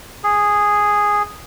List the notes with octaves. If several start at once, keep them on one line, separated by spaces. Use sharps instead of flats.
G#4